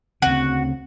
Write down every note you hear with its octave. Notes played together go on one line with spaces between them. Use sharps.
D2 C#3 C4 F#4